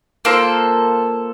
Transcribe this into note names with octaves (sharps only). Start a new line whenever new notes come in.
A#3 F4 A4 C5